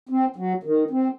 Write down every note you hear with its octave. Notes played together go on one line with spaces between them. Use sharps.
C4
F#3
D#3
C4